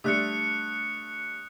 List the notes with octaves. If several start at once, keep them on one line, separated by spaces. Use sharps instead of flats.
D3 G3 A3 D#6 F#6 C#7